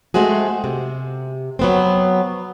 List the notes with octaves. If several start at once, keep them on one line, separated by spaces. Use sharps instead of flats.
G#3 A3 C4 F#4 G#4
C3
F#3 B3 C4